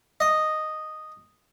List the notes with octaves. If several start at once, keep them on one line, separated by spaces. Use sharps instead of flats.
D#5